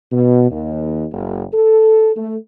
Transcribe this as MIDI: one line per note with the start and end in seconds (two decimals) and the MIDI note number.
0.12 0.48 47
0.51 1.05 39
1.12 1.44 30
1.54 2.11 69
2.16 2.37 57